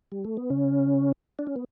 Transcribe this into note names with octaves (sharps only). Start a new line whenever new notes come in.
G3
A3
B3
C#3 C#4
D4
C#4
B3